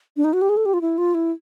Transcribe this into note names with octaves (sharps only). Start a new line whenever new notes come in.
D4
D#4
F#4
G4
G#4
A4
G4
F4
E4
F4
E4